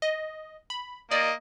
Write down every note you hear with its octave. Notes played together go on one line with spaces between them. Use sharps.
D#5
B5
A#3 D5 D#5